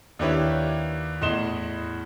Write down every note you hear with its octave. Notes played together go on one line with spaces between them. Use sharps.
D#2 D4 E4 G4 B4 C#5
E2 A2 D#5 C6 E7 G7